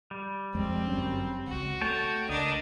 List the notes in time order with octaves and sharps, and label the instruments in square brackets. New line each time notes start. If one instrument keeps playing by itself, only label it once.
[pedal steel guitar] G3
[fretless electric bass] F2 G#3 [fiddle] C4
[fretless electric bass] G1 F#2 C#4
[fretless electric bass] E1 C#2 [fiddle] F#4
[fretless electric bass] A3 [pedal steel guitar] C#5 G5 A5
[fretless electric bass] C#2 [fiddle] D4 A#4 [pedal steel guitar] D#5